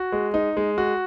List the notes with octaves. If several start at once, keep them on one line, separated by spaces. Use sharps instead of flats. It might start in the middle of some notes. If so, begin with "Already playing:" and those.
Already playing: F#4
G#3
D#4
G#3
F#4